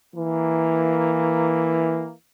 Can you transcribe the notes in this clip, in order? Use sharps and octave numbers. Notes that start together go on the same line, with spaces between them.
E3 A#3